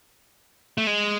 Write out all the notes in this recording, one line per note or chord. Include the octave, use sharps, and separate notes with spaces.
A3
G#3